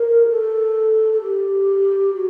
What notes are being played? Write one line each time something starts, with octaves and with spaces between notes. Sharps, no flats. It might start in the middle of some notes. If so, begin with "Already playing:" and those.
Already playing: A#4
G4
A4
A4
G4
F#4